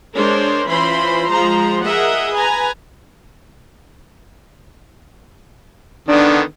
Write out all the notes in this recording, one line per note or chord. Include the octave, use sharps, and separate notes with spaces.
G#3 D4 A#4 C5 C#5
E3 C#4 F4 C5 B5 C6
F3 G#3 C5 A#5
G#4 A#4 D#5 E5 F#5
B4 G#5 A#5
D3 D#3 B3 D4